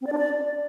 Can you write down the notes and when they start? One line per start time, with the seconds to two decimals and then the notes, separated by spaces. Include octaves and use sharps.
0.01 C4
0.07 D5
0.12 D4
0.18 D5